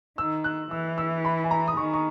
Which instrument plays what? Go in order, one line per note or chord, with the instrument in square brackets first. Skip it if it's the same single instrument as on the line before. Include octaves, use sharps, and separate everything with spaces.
[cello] D#3 [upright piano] E6
[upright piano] F#6
[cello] E3 [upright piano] E6
[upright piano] E6
B5
G#5
A#5
D#6
[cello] D#3 [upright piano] C#6
[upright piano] C#6